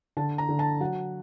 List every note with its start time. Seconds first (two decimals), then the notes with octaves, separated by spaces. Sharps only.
0.17 D3 A5
0.38 A#5
0.49 D3
0.59 A5
0.80 F#3 F#5